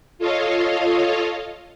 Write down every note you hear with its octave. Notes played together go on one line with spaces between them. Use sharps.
F4 A4 C#5 D#5 F5